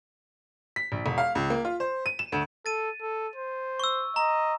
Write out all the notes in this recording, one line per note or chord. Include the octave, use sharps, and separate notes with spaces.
B6
A#1
E1
F5
C#2
A#3
F4
C5
D#7
E7
D2
A4 A6 D#7
A4
C5
C#6 E6
D#5 A#5